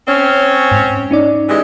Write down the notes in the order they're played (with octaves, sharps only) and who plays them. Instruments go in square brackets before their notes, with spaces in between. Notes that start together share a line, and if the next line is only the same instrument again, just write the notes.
[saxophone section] C4 C#4 [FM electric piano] C#5
[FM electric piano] G#2
C#4 D#4 D5
[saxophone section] E3 G#3 G4